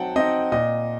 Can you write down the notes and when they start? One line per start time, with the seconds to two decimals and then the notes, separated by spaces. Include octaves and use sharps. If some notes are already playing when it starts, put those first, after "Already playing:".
Already playing: F#3 C4 D#4 F#5 G5 A5
0.16 C4 D#4 D#5
0.52 A#2 D#5